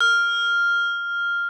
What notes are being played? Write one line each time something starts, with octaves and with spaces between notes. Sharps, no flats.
F6